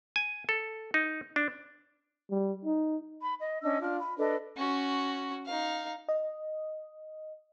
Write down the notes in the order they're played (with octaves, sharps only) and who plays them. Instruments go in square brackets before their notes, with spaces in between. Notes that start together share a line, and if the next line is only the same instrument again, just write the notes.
[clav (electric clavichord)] G#5
A4
D#4
D4
[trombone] G3
D#4
[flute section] B5
D#5
C#4 D4 D#5 E6
D4 F4 F6
B5
D4 A4 B4 D#5
[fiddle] C#4 F#4
D#4 F5
[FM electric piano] D#5